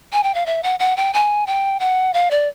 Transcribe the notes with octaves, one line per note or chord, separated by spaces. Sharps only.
G#5
G5
F5
E5
F#5
F#5
G5
G#5
G5
F#5
F5
D5